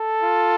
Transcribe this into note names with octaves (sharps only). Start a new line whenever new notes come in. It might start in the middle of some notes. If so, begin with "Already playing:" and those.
Already playing: A4
F4